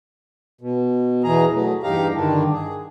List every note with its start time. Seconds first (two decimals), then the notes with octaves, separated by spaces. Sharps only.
0.61 B2
1.24 E2 B2 E3 G#4 A#5
1.53 F#3 A3
1.83 E2 G2 D#4 G4 F5 A#5
2.15 G2 D3 D#3 D4
2.53 G#4